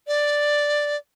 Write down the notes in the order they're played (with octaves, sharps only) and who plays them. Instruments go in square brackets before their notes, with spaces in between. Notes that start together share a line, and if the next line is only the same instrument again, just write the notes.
[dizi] D5